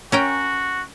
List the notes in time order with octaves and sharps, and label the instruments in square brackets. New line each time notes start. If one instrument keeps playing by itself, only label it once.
[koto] C#4 A#4 G5 [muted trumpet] F#4